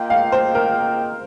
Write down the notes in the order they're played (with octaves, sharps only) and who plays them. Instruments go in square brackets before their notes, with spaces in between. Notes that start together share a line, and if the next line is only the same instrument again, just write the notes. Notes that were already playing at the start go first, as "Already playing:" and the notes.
Already playing: [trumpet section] A#3 F4 D#5 G5
[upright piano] F5
C5
A#4